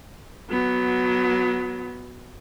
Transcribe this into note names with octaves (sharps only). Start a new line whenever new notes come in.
F#3 B3